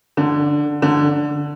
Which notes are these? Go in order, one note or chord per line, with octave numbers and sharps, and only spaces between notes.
D3
D3